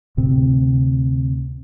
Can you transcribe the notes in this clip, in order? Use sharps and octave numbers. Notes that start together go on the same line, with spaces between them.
D2 A2 C3 C4